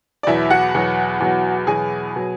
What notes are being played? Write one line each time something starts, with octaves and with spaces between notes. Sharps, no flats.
D5
E2 B2 F#3 E4 E5
F#4 F#5
E2 B2 F#3
E2 B2 F#3
E2 B2 F#3 G#4 G#5
B2 F#3